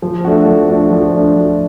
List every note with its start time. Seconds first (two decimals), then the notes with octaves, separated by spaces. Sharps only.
0.02 F3
0.25 A3 D4 F#4
0.46 F3
0.68 A3 D4 F#4
0.90 F3
1.12 A3 D4 F#4
1.35 F3